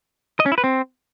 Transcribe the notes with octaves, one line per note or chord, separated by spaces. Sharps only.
D#5
C#4
E4
B4
C4